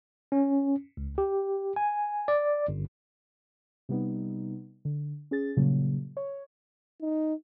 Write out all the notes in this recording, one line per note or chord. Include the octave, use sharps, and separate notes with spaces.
C#4
C#2
G4
G#5
D5
G1
C3 G3 B3 D#4
D3
C#4 G#4 A6
A#2 C#3 F#3 G3 A#3
C#5
D#4